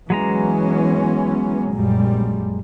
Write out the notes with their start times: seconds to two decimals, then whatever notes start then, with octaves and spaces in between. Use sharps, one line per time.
0.10 E3 F#3 G#3 B3 C#4 A#5
1.73 A#1 F#2 G3